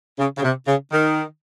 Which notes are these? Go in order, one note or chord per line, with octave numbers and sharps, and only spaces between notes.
C#3
C#3
C3
C#3
D#3